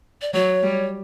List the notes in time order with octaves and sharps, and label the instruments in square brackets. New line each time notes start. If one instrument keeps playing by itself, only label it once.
[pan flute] D5
[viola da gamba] F#3 [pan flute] C#5
[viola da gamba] G3